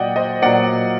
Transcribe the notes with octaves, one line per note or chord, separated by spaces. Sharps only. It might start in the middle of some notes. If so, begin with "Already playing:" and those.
Already playing: A#2 F#3 D5 D#5 F#5 G5
C5 D#5
A#2 F#3 D5 F#5